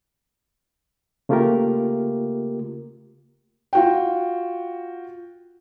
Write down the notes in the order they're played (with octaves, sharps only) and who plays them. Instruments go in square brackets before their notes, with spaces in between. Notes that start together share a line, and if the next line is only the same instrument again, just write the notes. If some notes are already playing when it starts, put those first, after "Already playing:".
[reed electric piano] C#3 A3 A#3 F4 G4 A#4
[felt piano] F4 F#4 G5